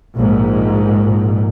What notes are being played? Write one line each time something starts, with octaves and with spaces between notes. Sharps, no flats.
A#1 G#2